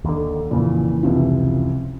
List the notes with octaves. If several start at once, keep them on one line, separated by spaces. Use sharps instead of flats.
D#2 D3
F2 A#2 C#3 E3
C#2 C3 F3